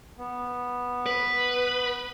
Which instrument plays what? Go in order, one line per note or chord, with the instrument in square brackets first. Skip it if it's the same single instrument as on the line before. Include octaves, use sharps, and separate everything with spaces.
[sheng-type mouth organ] B3
[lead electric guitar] B4